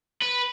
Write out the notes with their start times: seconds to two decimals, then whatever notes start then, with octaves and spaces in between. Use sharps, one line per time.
0.22 B4